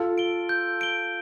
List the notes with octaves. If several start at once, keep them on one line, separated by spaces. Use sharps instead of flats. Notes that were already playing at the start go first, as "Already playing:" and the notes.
Already playing: F4 A4
D7 G7
G6
D7 G7